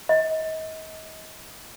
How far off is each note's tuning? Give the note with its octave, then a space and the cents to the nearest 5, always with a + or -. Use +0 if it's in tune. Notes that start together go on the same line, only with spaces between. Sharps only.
D#5 +35